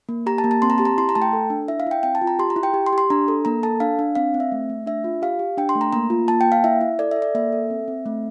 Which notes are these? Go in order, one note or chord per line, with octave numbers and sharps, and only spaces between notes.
A#3
G4 A#5
A5
A#3
A5
C4 C6
A#5
G4 A5
A#5
E4 C6
A#5
A3 A5
G5
A4
D4
E4 E5
F5
E4 G5
C4 G5
A5
F4
A#5
G4 C6
A#5
E4
G5
G4
C6
G4
C6
D4 A#5
A4
A#3 A#5
A4 A5
D4 F5
D4
C4 F5
C4
E5
A3
A3
D4 E5
F4
G4 F5
G4
D4 G5
C6
A3
A#5
A#3 A#5
F4
A#3 A5
G5
A#3
F5
E4 E5
E4
A4 D5
A4 E5
D5
A#3 E5
A4
C4
C4
A3